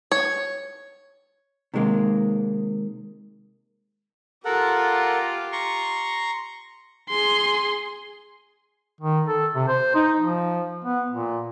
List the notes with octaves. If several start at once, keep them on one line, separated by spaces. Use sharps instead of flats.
C#5
C3 D#3 G#3 A#3
F4 G4 A4 A#4 F#5
A#5 C6 C#6
G#4 C6
D#3
A4
C3
C5
D#4
F3
B3
A#2